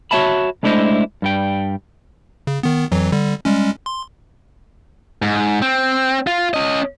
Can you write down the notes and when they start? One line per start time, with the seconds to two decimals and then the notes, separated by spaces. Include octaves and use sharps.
0.11 F#4 C#5 E5 A5 B5
0.63 G#3 A3 D4 E4 C5 D#5
1.22 G2 G3 G5
2.47 C#3
2.63 D#3 B3
2.92 F2 E3 F#3
3.12 D3 G3
3.45 G3 G#3 C#4
3.86 C6
5.22 G#2
5.62 C4
6.27 F4
6.54 C#4 D#5